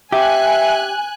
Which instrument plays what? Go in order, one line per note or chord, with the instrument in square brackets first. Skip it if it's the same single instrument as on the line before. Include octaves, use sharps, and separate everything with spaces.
[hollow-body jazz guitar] G4 [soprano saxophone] E5 [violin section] G#5 F#6